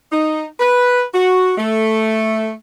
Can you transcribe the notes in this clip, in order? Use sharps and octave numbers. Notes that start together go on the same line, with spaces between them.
D#4
B4
F#4
A3